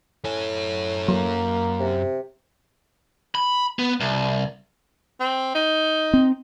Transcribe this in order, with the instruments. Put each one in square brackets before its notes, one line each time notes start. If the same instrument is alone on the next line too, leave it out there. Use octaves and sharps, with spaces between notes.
[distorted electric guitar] F#2 G#5 [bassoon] A2
[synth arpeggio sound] F#3 [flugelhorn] A#3
[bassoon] C3
[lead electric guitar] B5
B3
C2
[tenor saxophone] C4
D#4
[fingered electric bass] C4